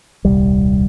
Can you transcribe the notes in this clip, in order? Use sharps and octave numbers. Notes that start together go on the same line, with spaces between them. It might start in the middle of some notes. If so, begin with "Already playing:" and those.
D#1 C2 G3